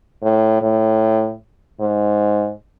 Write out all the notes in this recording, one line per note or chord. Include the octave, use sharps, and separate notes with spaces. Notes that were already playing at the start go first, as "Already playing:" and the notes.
A2
A2
G#2